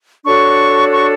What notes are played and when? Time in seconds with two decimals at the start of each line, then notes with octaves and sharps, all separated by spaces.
0.24 D4 F#4 A4 C#5 C#6
0.91 C#6